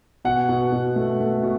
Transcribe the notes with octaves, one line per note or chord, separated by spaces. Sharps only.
B2 F#5
B2
B2
A3
A3
B2